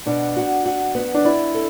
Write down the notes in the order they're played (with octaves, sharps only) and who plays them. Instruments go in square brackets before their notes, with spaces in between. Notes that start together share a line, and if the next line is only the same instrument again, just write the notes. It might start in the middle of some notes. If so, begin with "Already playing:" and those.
[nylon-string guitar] B2 [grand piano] D4
[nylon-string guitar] F#4
F#4
B3
[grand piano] D4
[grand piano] E4 [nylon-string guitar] D5
[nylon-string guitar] A4